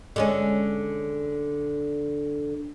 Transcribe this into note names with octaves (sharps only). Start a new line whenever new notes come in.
D3 G#3 C#4